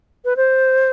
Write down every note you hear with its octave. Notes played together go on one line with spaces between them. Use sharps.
B4
C5